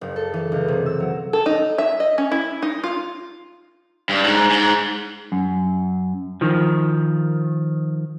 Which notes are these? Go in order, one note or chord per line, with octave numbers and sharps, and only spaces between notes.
F#1
A4
E3
C#2
C3
E6
F#3
A4
D#4
E5
D#5
C#4
E4
D#4
F4
G2
G#2
G#2
F#2
D#3 F3